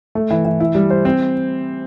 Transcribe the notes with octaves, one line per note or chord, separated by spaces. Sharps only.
A3
E3
E3
E4
G3
C5
C4